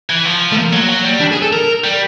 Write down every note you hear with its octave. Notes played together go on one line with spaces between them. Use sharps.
E3
F3
A3
A#3
F#3
F#3
G3
D4
G#4
A4
A#4
G3